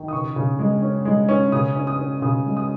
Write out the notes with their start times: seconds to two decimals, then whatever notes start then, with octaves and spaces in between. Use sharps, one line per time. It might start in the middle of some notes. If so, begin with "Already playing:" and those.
Already playing: D#3
0.08 D#6
0.13 C#3 C#6
0.36 C#3
0.59 G#3
0.82 C#4
1.05 G#3
1.29 C#4
1.52 C#3 D#6
1.76 C#4
1.87 D#6
1.98 C#4
2.22 C#3 D#6
2.46 G#3
2.57 D#6